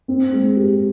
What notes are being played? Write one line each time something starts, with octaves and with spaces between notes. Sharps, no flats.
C4
G#3
G4